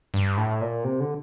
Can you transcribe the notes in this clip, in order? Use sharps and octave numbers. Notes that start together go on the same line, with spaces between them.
G2
A2
A#2
C3
D3